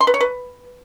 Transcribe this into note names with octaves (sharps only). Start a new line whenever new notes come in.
C6
B4
C#5
B4